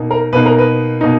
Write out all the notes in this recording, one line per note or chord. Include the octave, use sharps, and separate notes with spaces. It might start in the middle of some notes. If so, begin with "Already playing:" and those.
Already playing: B2 A#3 D#4
A#4
B2 A#3 D#4 B4
A#4
B4
B2 A#3 D#4